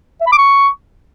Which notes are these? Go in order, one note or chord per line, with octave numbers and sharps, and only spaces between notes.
E5
B5
D6
C#6